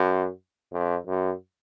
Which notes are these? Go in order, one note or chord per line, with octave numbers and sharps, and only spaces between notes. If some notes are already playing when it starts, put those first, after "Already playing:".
Already playing: F#2
F2
F#2